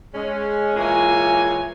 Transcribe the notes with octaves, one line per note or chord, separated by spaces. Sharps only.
G#3 C#4
A#2 E3 G#3 C#5 G#5